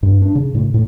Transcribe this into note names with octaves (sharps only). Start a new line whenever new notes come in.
G2
D4
C#3
A2
A2